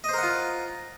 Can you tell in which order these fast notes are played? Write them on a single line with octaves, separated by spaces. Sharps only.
D#5 C5 A#4 F#5 F4